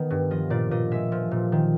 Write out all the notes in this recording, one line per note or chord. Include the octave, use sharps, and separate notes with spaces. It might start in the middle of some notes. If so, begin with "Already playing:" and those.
Already playing: D#3 B3
G2
F3 D#5
A#2 D5
A#2 D#5
G#3 E5
F3
A#2
D#3